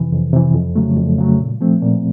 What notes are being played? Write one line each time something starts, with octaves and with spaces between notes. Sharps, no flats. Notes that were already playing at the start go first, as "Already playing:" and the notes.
Already playing: F2 C3 E3
F2
C3 E3
F2
C#3 F#3 A3
F2
C#3 F#3 A3
A#2
F3 A3 C4
A#2